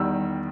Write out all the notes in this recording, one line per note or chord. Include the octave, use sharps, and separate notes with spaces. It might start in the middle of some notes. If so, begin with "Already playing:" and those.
Already playing: E2 D#3 G3 E6